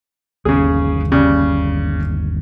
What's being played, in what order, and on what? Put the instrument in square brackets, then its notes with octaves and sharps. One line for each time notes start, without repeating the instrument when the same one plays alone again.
[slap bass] G1 D#2 A#3 [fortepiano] C#3 G#4
[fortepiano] C#3 G3